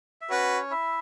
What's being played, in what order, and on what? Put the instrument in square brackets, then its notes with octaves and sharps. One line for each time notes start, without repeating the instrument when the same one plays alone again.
[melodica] E5
[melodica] C#4 C#5 [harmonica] F#4 B4
[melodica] E4 E5